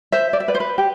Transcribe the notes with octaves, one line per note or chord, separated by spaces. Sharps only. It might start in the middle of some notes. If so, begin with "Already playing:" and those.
C5 E5
D5
E5
B4 D5
C5
B4
G4